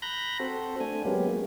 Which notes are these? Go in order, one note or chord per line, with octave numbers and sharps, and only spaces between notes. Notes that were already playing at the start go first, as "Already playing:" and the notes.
A#5 B5 F#6 G6 A#6
C4 F#4 A4 C5
A3 D4 G#5
F#3 G#3 A#3 B3 C#4 G4
G#3